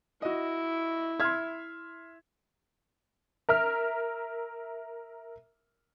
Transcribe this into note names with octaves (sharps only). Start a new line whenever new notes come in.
E4 F#4 D#5
E5 C6 F6 G#6
A#4 E5 F6